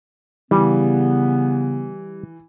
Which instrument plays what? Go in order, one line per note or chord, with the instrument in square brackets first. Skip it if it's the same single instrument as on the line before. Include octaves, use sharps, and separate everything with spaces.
[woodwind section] C#3 B3 [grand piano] E3 [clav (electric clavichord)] G3